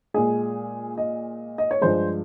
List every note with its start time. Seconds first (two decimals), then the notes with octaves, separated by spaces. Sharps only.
0.14 A#2 G#3 G#4
0.98 D#5
1.58 D#5
1.71 C#5
1.81 G2 F3 G#3 C5